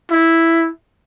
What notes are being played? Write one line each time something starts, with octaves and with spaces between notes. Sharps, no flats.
E4